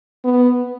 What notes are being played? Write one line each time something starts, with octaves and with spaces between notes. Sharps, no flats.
B3